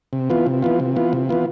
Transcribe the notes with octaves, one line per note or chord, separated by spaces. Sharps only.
C3
E3 B3 F4
C3
E3 B3 F4
C3
E3 B3 F4
C3
E3 B3 F4